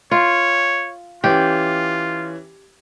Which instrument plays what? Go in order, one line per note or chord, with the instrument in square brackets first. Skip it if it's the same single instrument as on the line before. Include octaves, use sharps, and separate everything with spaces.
[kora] F4 [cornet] C#5
[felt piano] E3 C#4 [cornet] F4 [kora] G4